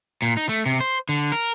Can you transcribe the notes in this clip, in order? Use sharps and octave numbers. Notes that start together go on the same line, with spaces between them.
A#2
D#4
A3
C3
C5
D3
A#4